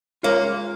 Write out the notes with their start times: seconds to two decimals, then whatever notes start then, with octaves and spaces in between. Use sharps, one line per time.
0.23 G#3 A#3 C#4 F4 A#4 C#5